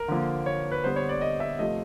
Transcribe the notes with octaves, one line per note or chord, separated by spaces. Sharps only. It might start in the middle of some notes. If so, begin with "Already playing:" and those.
Already playing: A#4
D3 F3 A#3
C#5
B4
D3 G3 B3 C5
C#5
D5
D#5
E5
C3 F3 A3 D#5